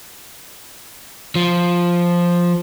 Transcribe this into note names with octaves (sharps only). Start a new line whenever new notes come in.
F3